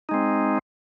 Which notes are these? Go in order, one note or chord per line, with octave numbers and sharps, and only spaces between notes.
G#3 C4 D#4